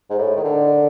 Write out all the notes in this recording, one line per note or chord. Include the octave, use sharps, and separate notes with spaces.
G#2
A2
D#3
D3